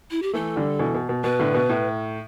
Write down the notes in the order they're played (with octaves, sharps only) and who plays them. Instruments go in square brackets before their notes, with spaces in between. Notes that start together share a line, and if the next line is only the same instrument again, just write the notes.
[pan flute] E4
G4
[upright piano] E3 A3 [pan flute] A4
[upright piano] D3 G3
B2 E3
B2
B2
[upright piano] B2 [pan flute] B4
[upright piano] A2 D3
B2
A2